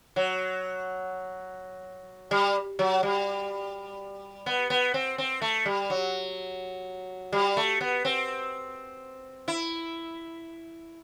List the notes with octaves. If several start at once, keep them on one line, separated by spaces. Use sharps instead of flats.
F#3
G3
F#3
G3
B3
B3
C4
C4
A3
G3
F#3
G3
A3
B3
C4
E4